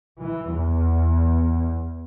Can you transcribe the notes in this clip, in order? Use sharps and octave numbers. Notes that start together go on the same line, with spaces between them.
E3
E2